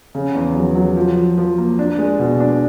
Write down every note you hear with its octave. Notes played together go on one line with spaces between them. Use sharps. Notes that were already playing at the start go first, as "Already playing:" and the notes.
C#3
E2
F#3
F#3
F3
F3
F3
A#3
D4
G#3
B2
D4